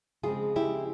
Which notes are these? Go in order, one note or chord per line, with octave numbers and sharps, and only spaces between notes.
C#3 F3 G#3 C4 F4 G#4
E4 G4